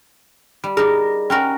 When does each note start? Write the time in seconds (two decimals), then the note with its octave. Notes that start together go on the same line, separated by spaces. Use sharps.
0.64 G3
0.77 D#4 G#4 A#4 D6
1.30 C#4 F#4 A#4 G5 B5